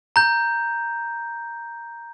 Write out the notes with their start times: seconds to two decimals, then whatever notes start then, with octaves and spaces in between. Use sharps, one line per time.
0.16 A#5 G6